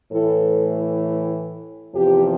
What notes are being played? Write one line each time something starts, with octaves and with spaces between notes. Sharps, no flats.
A2 E3 A4
E2 C3 F3 G4